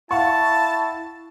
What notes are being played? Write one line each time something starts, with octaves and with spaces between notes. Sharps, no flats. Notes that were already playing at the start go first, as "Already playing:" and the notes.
E4 F5 F#5 A5 C#6